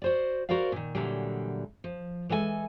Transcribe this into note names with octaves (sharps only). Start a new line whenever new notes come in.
F#4 C5 D5
F#4 A#4 C5 D5 F5
A#2 D#3
A#2 D3 E3 F#3 G3
F3
E3 G#3 A4 E5 G#5